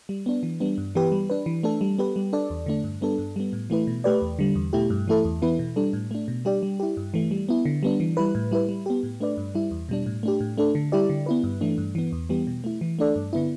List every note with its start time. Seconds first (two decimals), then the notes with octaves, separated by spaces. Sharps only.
0.09 G3
0.26 B3 D4
0.43 E3
0.60 G3 B3 D4
0.78 G2
0.95 E3 B3 G4 B4
1.12 G3
1.30 D4 B4
1.46 E3
1.63 A3 D4 A4
1.81 G3
1.98 B3 G4 B4
2.16 G3
2.33 D4 A4 D5
2.50 E2
2.66 D3 A3 D4
2.84 G2
3.01 G3 B3 D4 A4
3.18 G2
3.36 G3 B3
3.53 A2
3.70 E3 A3 E4 B4
3.87 B2
4.04 A3 G4 B4 D5
4.22 E2
4.39 D3 G3
4.55 E2
4.73 B2 A3 E4 G4
4.90 G2
5.08 E3 A3 E4 A4
5.25 E2
5.42 E3 B3 E4 B4
5.59 B2
5.76 G3 D4 A4
5.93 A2
6.11 A3 D4
6.28 B2
6.45 G3 D4 G4 D5
6.63 G3
6.80 E4 G4
6.97 G2
7.14 E3 A3
7.31 G3
7.49 B3 E4
7.65 D3
7.83 G3 B3 D4
8.00 E3
8.17 G3 E4 B4
8.35 A2
8.51 G3 E4 B4
8.69 G3
8.86 B3 G4
9.03 A2
9.20 A3 D4 B4 D5
9.37 G2
9.55 G3 E4
9.71 E2
9.89 B2 G3 D4
10.06 A2
10.23 A3 D4 G4
10.40 A2
10.58 A3 D4 A4
10.75 D3
10.92 G3 E4 G4 D5
11.09 D3
11.26 B3 E4 B4
11.44 G2
11.61 E3 A3 D4
11.78 G2
11.95 E3 B3
12.12 E2
12.29 E3 G3 B3 G4
12.47 B2
12.64 A3 E4
12.81 E3
12.99 A3 D4 A4 D5
13.16 G2
13.33 D3 B3 E4